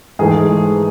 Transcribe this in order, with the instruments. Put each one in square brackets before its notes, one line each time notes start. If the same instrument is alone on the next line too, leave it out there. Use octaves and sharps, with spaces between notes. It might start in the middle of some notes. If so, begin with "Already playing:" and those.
[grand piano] G#2 E3 A3 G#4